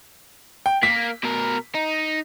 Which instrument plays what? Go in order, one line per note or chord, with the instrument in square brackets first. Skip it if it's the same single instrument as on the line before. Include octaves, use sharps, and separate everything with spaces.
[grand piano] G5
[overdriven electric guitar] A#3 [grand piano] B6
[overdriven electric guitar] B2 A#4
D#4